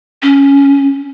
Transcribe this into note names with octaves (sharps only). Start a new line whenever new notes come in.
C#4